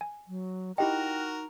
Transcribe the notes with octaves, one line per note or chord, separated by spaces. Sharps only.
G#5
F#3
D#4 E4 F#4 G4 A#4 D#5 G5